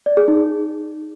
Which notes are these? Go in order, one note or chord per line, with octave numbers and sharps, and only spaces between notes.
D5
G#4
D#4